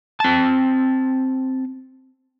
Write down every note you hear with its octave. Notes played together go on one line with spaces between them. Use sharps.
C4 A5